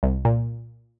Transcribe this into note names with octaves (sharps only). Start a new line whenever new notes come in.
C2
A#2